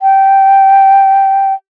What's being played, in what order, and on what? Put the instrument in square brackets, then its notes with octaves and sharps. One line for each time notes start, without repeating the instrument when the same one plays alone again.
[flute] G5